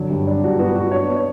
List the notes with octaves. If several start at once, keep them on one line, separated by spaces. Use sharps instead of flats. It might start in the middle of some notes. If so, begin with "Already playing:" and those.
Already playing: D3 F#3
G2
D4
G2 F#4
B3 F#4
B3 F#4
D4 C#5
B3
C#5